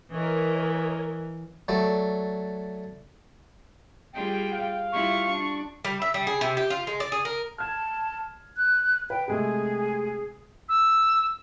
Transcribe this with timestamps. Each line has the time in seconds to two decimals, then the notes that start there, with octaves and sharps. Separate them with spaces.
0.12 E3 A#4 C#5 D#5
1.68 F#3 A3 D5
4.13 G3 F4 G#4 G5
4.53 F5
4.92 G3 E4 F4 C#6
5.29 D4
5.85 G3
6.02 E5
6.14 G3
6.27 G#4
6.41 C3
6.57 G4
6.70 F4
6.87 G#3
7.00 D5
7.12 G#4
7.25 A#4
7.58 A5 F6 G#6
8.57 F#6
9.10 B4 G5
9.28 C3 G#3 A3 G#4
10.69 E6